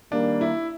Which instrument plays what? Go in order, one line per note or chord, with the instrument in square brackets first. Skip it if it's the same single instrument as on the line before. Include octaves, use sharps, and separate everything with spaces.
[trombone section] D#3 G3 A#3 [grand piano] D4
[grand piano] E4